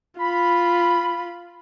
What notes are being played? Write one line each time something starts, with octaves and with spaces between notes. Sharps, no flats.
F4 B5